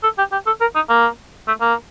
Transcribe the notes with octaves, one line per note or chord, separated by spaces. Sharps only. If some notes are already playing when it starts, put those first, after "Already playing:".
A4
G4
G4
A4
A#4
D#4
A#3
A3
A#3